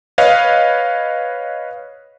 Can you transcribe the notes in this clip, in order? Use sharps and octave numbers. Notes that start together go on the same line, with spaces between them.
B4 C#5 D#5 F5